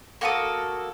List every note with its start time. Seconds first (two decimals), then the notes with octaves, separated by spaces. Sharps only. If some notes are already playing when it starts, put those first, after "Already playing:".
0.21 A#3 F#4 A4 D#6